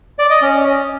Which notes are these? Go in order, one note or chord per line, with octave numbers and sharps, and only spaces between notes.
D5
D#5
C#4